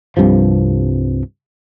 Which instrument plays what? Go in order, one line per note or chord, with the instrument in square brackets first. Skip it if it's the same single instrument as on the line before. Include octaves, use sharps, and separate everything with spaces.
[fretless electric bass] C2 G2 C3 F3